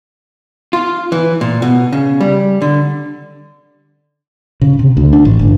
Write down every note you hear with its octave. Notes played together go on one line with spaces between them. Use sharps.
F4
E3
A#2
B2
C#3
G3
D3
C#3
C3
D2
D4
A1
G1